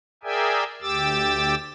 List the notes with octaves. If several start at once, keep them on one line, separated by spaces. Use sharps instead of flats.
G#4 A#4 D5 E5 G5 G#5
D2 G4 D6 E6 A6